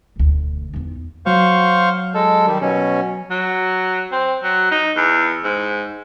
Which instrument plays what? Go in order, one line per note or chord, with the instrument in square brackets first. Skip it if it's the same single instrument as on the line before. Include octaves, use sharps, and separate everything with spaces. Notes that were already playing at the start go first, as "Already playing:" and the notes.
[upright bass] E1 D2
E2 D#4
[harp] F#3 [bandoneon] C5 F5 C#6
[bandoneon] G#3 A4
D#3 G3
B2 C#4
[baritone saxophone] F#3
C4
F#3
D#4
E2
G#2